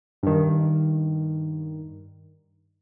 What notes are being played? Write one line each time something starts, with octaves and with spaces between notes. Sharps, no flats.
G2 D#3